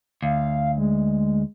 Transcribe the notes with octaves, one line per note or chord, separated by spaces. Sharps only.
D2 F5
G#3